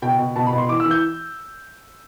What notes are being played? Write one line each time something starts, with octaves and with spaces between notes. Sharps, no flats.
B2 G5
B2
B2 A5
B5
B2
C6
E3 D6
E6
E3
G6